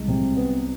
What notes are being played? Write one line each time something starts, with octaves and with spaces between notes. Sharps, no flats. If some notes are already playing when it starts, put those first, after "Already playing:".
Already playing: C2 G#3
C3
B3